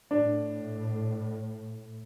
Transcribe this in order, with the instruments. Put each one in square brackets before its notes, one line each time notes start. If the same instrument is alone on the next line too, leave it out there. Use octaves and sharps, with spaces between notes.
[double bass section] A2 [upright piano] D4